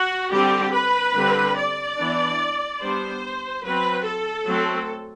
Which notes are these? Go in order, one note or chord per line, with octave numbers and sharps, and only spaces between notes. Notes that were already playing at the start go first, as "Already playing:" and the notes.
Already playing: F#4
D3 G3 C4 G4
B4
D3 G3 C4
D5
E3 B3 D4
G3 B3 D4 C5
F#3 C4 B4
A4
F#3 A3 C4